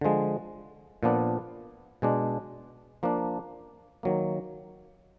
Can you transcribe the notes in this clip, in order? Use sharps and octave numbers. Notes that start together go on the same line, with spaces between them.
D3 F3 G#3
A#2 F3 B3 D4
B2 G#3 D4
F3 A#3 D4
D#3 F#3 A#3